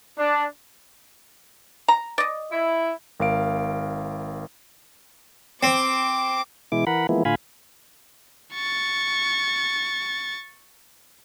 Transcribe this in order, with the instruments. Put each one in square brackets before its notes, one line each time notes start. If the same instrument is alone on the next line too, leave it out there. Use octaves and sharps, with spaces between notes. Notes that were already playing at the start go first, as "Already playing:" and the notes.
[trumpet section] D4
[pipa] A#5
D5 D#5
[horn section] E4
[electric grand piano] G#1 A#4 F5 D7
[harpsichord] C4 [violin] D6
[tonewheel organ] B2 E3 G#3 E4 D6
E3 A#4 F#5 B5
E3 F3 G#3 A#3 B3 E4
A2 D3 F4 F5 G#5 B5
[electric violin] C#6 A6